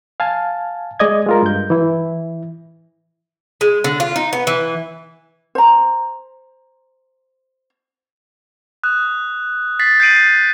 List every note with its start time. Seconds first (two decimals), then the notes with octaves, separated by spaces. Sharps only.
0.20 F5 G#5 A5
1.00 G#3 D5 D#5 G#6
1.26 G#3 F4 A#4
1.43 G2 G6
1.70 E3 E4
3.61 G#3
3.84 D3
4.00 F4
4.16 D#4
4.33 B3
4.47 E3
5.55 C5 A#5
8.83 D#6 F#6
9.80 A6 B6 C7
10.00 G6 A6 C7 D7 D#7 F#7